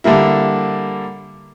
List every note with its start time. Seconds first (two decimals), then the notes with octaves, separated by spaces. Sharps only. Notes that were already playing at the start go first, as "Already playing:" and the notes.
0.04 D3 G3 A#3 E4